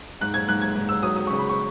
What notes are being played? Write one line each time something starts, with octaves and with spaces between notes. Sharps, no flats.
G#2 F#6
G#6
G#2 F#6
G#6
G#2
E6
F#3 D#6
D#6
C#3 C#6
B5
C#6